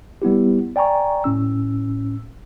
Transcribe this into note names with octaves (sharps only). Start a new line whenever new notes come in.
G3 B3 E4 G4
D5 G5 G#5 A#5 C#6
A2 C#4 E6